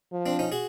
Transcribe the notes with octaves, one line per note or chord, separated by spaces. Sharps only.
F3
C4 D4
C#4 D#4
F#4 G#4